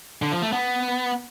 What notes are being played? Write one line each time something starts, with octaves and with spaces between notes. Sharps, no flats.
D3
F3
A3
B3